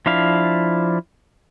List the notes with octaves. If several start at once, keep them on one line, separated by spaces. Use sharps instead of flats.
F3 D4 E4 F5